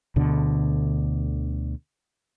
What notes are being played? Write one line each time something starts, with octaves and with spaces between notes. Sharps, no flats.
D2 B2 D3